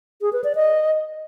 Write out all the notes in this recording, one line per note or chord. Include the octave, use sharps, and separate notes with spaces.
G#4
B4
D5
D#5